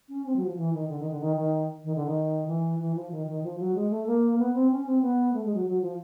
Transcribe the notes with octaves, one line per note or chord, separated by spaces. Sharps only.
C#4
C4
F#3
F3
E3
D#3
D3
D#3
D3
D#3
D#3
D#3
D3
D#3
E3
E3
F3
D#3
D#3
F3
F#3
G#3
A3
A#3
B3
C4
C#4
C4
B3
A3
G#3
F#3
F#3
F3